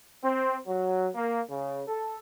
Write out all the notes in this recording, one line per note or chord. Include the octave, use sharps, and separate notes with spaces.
C4
F#3
A#3
C#3
A4